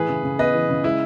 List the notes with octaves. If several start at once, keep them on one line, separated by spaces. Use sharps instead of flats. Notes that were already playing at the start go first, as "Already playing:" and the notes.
Already playing: A2 E3 G#4 B4
C#3
C#3
B3 B4 D#5
E3
C#3
G#3 E4